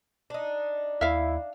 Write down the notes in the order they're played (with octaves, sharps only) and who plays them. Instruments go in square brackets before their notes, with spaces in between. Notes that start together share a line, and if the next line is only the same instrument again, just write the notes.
[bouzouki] D4 D#4
[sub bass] D#2 [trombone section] E4 [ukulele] E5 F5